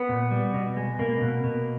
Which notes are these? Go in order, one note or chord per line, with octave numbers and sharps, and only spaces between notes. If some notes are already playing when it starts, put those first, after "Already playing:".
Already playing: B3
A#2
G3
B2
G#3
B2 A#3
B2
B2